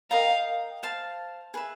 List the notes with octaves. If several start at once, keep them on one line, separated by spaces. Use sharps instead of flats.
A#4 D#5 F5 G5 A#5
C5 F5 A5
G#4 B4 E5